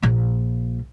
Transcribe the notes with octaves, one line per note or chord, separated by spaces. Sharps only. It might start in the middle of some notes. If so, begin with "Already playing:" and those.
A#1 A#2